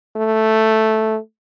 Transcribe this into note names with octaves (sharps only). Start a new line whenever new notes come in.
A3